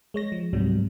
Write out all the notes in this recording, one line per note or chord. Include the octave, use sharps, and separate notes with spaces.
G#3 C#5 A#6
F3
C#2 G#2 C3 F#3 G3